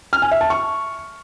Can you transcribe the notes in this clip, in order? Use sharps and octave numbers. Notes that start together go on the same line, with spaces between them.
F6
G#5
E5
A5
C#6